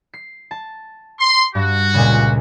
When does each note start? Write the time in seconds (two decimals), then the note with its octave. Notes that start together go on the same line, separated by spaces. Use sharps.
0.14 C7
0.51 A5
1.19 C6
1.55 G2 F#4
1.94 C#2 A#2 C#3